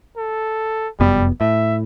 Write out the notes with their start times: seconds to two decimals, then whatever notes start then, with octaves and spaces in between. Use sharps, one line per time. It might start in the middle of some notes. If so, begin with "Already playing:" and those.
0.17 A4
1.00 F1 F#2 G3 B3
1.41 A2 E5